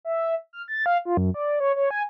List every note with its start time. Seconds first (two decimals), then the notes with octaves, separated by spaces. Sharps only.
0.05 E5
0.53 F6
0.68 A6
0.86 F5
1.05 F4
1.17 F#2
1.34 D5
1.60 C#5
1.76 C#5
1.91 G#5